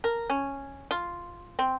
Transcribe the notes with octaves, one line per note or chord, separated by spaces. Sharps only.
A#4
C#4
F4
C4